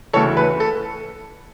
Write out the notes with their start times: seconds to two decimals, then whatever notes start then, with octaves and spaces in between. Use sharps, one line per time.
0.13 D2 C#3 E3 A4 C#5
0.37 B4
0.60 A4